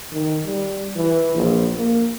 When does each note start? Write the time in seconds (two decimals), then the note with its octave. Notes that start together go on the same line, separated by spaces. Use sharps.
0.12 D#3
0.45 G3
0.96 E3
1.35 A#1
1.76 A#3